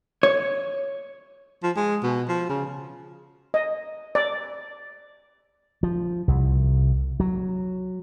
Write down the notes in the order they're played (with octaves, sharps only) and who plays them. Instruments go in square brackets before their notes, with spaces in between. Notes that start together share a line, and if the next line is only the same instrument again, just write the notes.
[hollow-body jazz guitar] C#5
[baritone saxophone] F3
G#3
B2
F3
C#3
[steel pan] D#5
D5
[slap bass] F3
C2
F#3